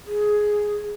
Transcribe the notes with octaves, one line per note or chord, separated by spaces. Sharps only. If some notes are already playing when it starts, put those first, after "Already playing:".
G#4